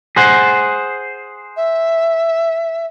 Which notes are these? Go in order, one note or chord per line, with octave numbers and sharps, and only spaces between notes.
G#4 C5 F#5
E5